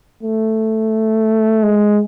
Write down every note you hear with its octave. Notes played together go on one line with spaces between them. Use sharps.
A3
G#3